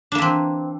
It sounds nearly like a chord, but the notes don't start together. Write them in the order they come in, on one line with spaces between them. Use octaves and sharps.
D4 A#3 E3 C4